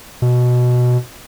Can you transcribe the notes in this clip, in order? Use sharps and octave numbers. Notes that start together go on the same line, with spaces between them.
B2